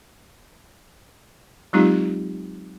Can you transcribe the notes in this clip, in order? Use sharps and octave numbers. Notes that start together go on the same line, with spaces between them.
F#3 G#3 C4 D#4 F4 G4